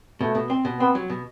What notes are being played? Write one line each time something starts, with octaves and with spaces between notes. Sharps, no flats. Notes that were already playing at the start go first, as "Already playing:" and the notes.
B2 A3
B2
C4
B2
B3 C4
F#3
B2